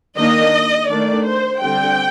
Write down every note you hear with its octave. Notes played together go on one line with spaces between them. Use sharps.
D#3 A#3 D4 D#5
D#3 A3 D4 D5
C5
D3 G3 C4 G5